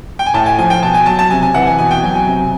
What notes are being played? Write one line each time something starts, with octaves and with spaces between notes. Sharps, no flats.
G5
G#5
A2 A5
G#5
F3 G#5
G5
B2 A5
G#5
F#3 A5
A5
C3 G#5
G#5
E3 F#5
G#5
B2 G#5
G5
F#3 G#5
G#5
C3